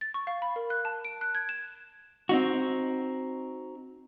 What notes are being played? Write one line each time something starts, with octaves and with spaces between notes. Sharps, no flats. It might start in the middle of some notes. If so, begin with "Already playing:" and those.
A6
C#6
F5
B5
A#4
F#6
A5
D7
F#6
G#6
E7
C4 D#4 F#4